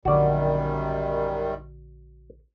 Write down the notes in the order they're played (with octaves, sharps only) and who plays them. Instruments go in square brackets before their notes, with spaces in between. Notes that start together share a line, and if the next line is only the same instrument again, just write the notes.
[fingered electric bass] A#1 D3 [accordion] F#2 D#3 G3 [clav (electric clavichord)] F#4 D5